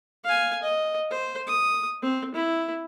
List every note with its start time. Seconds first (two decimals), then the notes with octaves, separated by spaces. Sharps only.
0.25 F5 G#5
0.63 D#5
1.11 C5
1.47 D#6
2.03 C4
2.35 E4